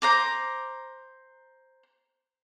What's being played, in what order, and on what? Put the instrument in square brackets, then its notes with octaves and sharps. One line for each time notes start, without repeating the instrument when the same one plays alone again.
[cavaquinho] C5 A#5 D6